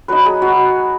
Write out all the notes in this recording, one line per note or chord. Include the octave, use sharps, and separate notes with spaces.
F#3 D#4 B4
G#4
F#4